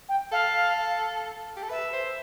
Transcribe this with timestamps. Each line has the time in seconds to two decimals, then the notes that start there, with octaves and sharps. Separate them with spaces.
0.09 G5
0.32 A4 F5
1.56 G4
1.63 A4
1.70 B4 E5
1.93 C5